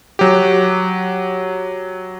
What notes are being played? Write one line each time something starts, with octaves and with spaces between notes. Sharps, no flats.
F#3 G4